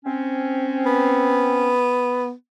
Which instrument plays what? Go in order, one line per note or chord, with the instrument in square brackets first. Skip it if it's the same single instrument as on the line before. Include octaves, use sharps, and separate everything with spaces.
[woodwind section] C4 C#4
[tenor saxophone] B3